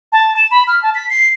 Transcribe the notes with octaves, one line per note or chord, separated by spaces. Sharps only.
A5
E7
B5
F6
A5
B6
C7